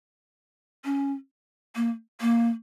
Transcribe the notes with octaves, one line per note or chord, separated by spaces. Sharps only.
C#4
A#3
A#3